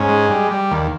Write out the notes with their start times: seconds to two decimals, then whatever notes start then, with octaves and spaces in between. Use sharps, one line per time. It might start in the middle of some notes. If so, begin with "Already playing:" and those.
Already playing: G#2 C#4
0.09 G#3
0.30 G3
0.51 G3
0.71 D#2